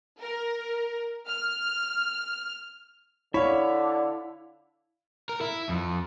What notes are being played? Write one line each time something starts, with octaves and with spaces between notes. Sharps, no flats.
A#4
F6
D3 E4 C#5 F5 B5
A#4
E4
F2